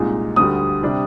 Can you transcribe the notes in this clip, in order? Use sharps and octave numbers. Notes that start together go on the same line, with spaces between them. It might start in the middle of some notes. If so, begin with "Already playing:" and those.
Already playing: C2 A#2 G#3 D#4
D2 D3 G3 D#6
C3 G3 D4